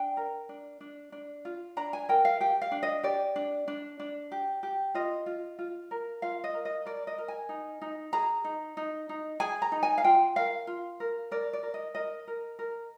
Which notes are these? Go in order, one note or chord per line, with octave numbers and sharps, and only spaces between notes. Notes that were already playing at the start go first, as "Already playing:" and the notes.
Already playing: D4 G5
A#4
D4
D4
D4
F4
D4 A#5
G#5
A#4 G5
F5
G4 G5
F5
D4
D#5
G4 D5
D4
D4
D4
G4
G4
F4 D#5
F4
F4
A#4
F4 F5
D#5
A#4
D#5
A#4 D5
D#5
A#4
G#5
D#4
D#4
G#4 A#5
D#4
D#4
D#4
G#4 G#5
A#5
D#4
G#5
F5
F4 G5
A#4 F5
F4
A#4
A#4 D5
D5
A#4
D#5
A#4 D#5
A#4
A#4